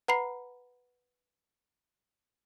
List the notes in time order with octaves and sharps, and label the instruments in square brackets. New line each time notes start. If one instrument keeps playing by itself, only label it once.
[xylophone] B4 F#5 A#5 B5 C7